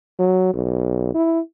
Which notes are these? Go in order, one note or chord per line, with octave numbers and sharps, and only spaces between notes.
F#3
B1
E4